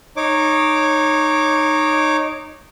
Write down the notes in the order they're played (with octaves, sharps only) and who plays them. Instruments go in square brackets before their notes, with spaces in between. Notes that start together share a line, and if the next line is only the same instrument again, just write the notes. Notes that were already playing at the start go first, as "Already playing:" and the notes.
[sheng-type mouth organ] D#4 C#5 D6